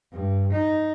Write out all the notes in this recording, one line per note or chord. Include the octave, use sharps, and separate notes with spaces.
G2
D#4